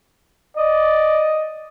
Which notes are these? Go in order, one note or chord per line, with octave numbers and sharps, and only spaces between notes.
D5 D#5